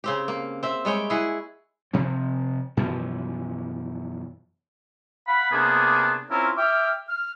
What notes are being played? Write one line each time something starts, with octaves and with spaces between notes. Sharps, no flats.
C#3 C4 G4
A#3
C4 E5
G3 G#3 C#5 G5
E4 G#4 F#5
C3 F3 C4
F#2 B2 E3 F3
F5 F#5 B5
C3 A#3 B3 D4 G#4
C4 C#4 E4 F4 A#4
E5 G5 D6 F6
F6